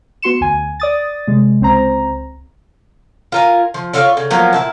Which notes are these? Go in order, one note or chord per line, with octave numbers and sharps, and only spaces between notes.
B3 F#4 C6 C#7 E7
D2 G#5
D5 D#6 A6
C3 G#3
C#2 C4 C5 A#5
F4 A#4 G#5
F3
F4 A4 C#5 D5
C#3
F3 F#3 A#3 B3
A#2 E4 A5